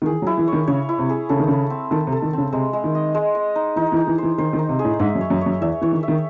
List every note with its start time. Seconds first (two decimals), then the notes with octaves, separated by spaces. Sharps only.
0.02 D#3
0.06 E3 G#4
0.22 F#3
0.27 E4
0.37 E3
0.48 C#5
0.53 D#3
0.67 C#3 C#5
0.89 E4
0.99 C3
1.09 G#4
1.29 C#3 A4
1.39 D#3
1.48 C#3 A4
1.70 C4
1.91 D#3 A4
2.07 C3
2.12 A4
2.22 D#3
2.33 C#3 C4
2.53 C3 G#3
2.73 G#3
2.84 D#3
2.95 D#5
3.15 G#3
3.35 D#5
3.56 D#4
3.76 E3 D#4
3.92 E3
3.97 D#4
4.07 E3
4.18 E3 C5
4.38 D#3 C5
4.53 D#3
4.59 D#4
4.69 C3
4.79 G#4
4.85 A2
4.99 G#2 E5
5.15 F#2
5.21 C#5
5.30 F#2
5.41 C#5
5.46 F#2
5.61 E2 E5
5.81 E3 C#5
5.92 D#3
6.03 E5
6.08 D#3